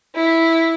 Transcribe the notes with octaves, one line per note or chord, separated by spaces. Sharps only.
E4